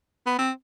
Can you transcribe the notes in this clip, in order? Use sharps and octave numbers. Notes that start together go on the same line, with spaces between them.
B3
C4